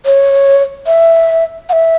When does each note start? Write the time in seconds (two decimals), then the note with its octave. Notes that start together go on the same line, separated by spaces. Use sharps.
0.05 C#5
0.87 E5
1.69 F#5
1.73 E5